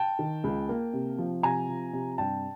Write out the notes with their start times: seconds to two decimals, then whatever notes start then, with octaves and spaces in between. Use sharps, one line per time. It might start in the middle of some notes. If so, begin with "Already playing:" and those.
Already playing: G5 A5
0.19 D#3
0.44 C#2
0.69 A#3
0.93 C3
1.18 F3
1.43 C3 G#5 A#5
1.69 F3
1.93 C3
2.18 G2 G5 A5